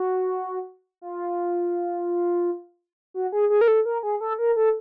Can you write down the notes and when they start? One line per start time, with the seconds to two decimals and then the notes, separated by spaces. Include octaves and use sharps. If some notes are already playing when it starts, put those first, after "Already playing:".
Already playing: F#4
1.02 F4
3.14 F#4
3.32 G#4
3.50 G#4
3.61 A#4
3.68 A4
3.85 A#4
4.03 G#4
4.21 A4
4.39 A#4
4.56 A4